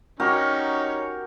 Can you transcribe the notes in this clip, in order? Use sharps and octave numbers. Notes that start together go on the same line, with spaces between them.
C#4 D#4 F#4 G4 A#4 C#5